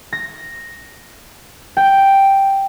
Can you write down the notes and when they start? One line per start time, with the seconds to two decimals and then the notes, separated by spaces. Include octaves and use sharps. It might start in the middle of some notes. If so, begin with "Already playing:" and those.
0.13 A#6
1.77 G5